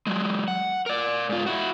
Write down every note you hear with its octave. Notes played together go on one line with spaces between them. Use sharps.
F#3 G#3
F#5
A#4 D5
G#2 F4
E4 F#4